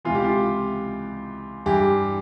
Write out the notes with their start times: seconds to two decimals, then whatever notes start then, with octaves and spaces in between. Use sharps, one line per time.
0.05 C#2 C3 E3 F4
0.15 G4
0.24 F4
1.66 G2 E3 G4